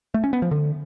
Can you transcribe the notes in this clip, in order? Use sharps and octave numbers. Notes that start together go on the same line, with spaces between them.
A3
C#4
B3
F3
D3